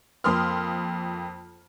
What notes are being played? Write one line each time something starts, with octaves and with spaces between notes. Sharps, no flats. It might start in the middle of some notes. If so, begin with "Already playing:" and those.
F2 A#3 C6 D#6 F6